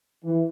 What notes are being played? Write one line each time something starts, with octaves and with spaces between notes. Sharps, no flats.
E3